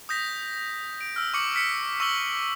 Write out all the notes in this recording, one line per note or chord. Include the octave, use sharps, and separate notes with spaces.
D#6 G6 A#6 B6
D7
E6 F6
C#6 D6 C#7 F#7
F6 B6 C#7
C#6 E6 B6 F#7 G7